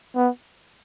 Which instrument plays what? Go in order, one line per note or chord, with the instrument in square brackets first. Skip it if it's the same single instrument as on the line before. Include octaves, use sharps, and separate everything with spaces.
[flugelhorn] B3